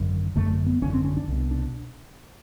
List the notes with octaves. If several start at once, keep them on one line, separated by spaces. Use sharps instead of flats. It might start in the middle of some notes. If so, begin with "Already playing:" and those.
Already playing: G#1 F#2 D3
G#1 F#2 D3 A3
B3
G#1 F#2 D3 C#4
C4
C#4
D4
C2 B2
D4